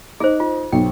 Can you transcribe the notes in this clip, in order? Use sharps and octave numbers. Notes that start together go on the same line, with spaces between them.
D#4 G#4 C5
F4
B1 G5